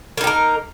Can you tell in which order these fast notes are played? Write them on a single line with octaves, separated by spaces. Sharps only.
A#3 D#4 G4 A#4